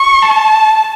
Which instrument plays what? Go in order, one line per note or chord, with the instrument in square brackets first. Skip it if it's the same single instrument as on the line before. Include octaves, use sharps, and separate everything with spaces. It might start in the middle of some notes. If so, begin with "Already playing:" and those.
Already playing: [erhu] C#6
A5